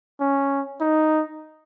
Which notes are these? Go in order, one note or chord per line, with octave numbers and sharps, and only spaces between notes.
C#4
D#4